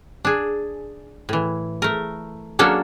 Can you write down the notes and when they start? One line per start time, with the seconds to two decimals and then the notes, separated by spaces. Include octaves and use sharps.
0.25 D4 G#4
1.29 A2 E3
1.82 A3 A#4
2.59 F#3 A#3 C#4 D4 A4